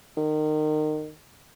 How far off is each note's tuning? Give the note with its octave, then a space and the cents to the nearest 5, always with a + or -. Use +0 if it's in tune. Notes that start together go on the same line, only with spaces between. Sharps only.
D#3 -25